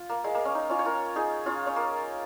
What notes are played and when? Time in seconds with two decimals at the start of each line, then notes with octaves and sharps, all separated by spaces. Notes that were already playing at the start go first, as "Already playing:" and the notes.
Already playing: F4
0.10 A#3
0.24 G#3
0.35 A#3
0.45 C#4
0.55 D#4
0.69 C#4 F4
0.79 C#5
0.85 F4 A#4
1.16 D#4 G#4
1.46 C#4 F4
1.66 C#4
1.76 A#3